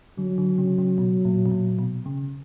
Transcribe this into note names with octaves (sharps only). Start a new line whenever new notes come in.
D3 F#3
D3
C#3
C#3
B2
A#2
B2
A#2
B2
C#3